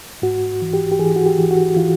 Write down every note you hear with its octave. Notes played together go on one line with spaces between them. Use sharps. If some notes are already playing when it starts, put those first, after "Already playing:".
G#2 F#4
E3
G4
G4
E3 G#4
F#4
G4
E3
F#4
E3 F4